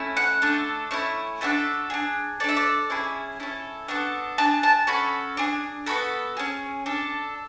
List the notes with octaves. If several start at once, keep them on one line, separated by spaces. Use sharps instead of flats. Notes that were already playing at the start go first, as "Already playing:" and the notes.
Already playing: A3 C#4 E4
F#5
A3 D4 A4
A3 C#4 E4
D4 F#4 A4 E5
D4 G#4
D4 A4 D5 E5
D5
C#4 E4 G#4
C#4 E4 A4
B3 D4 F#4 A4
D4 G#4 A5
A5
C#4 F#4 A4 B5
D4 G#4
B3 F#4 A4 B5
C#4 G#4
D4 A4